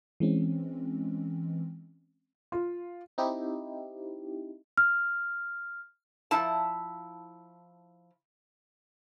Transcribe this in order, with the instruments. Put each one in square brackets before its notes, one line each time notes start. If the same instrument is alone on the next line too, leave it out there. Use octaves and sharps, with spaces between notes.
[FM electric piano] E3 G#3 C4 C#4
[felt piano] F4
[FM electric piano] C4 D#4 E4 G4
[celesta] F6
[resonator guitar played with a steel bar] F3 E4 A5